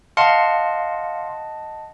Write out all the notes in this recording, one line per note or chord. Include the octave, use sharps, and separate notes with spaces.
D#5 F5 F#5 A5 C6 C#7